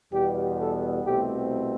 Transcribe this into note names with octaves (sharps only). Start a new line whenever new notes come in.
E2 B2 G3 B3 G4
A4
C2 B2 A3 C4 G4